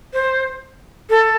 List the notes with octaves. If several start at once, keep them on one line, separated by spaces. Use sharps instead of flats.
C5
A4